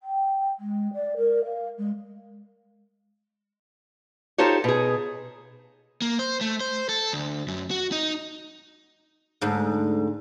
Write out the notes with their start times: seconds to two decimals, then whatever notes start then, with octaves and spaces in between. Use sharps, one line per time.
0.01 G5
0.59 G#3
0.93 D5
1.16 A#4
1.44 F5
1.78 G#3
4.38 D#4 F4 G4 A4 C5 C#5
4.64 B2 G#4
6.02 A#3
6.19 C5
6.41 A3
6.61 C5
6.89 A4
7.13 D2
7.48 F#2
7.71 F#4
7.92 D#4
9.41 D2 G#2